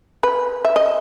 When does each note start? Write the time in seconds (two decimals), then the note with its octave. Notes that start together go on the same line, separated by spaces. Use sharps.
0.23 B4
0.65 E5
0.76 D#5